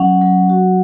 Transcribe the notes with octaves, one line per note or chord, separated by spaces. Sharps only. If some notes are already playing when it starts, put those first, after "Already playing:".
Already playing: F#3 C#4 F#5
F#3
F#4